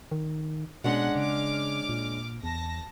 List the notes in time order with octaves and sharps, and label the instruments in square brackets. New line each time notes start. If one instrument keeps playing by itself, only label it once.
[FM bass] D#3
[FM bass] B2 [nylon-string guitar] G#3 C#4 D4 [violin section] F#5 C6
[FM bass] C#3 [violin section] D6 F6
[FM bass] A#2
[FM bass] E2 [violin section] A5 A#6